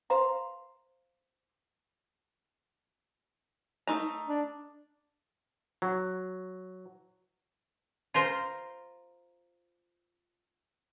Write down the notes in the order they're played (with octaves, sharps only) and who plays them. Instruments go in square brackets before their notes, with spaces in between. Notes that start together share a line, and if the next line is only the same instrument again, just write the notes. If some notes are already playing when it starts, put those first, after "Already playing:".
[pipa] C5 F5 A#5
[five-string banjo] A3 D#4 A#5
[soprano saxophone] D4
[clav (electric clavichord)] F#3
[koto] F4 A#4 C5